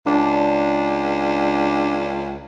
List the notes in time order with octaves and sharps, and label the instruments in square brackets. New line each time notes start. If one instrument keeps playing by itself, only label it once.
[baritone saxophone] C#2 [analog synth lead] D4